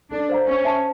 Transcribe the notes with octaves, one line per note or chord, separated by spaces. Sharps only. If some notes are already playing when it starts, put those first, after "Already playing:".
D4 A4
C5 F5 A#5
C#4 C5
E5 A5